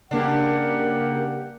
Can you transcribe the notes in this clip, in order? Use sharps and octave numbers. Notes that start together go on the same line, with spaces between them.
G2 C#3 A#3 D4 G4 A#4 F#5